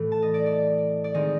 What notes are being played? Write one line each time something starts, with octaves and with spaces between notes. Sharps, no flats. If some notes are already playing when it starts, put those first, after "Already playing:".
Already playing: A2 E3 A3
A5
D#5
D5
D5
D5
D#3 G#3 C4 D#4 D#5